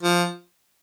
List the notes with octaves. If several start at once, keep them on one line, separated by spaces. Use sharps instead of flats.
F3